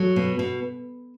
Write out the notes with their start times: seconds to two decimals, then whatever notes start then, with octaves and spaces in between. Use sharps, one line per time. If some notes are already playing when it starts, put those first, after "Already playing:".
Already playing: F#3 A4
0.16 B2
0.39 B2